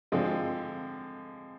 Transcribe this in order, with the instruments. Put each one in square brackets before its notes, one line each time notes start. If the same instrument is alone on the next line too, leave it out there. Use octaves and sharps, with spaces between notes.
[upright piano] D3 F3 G#3 C4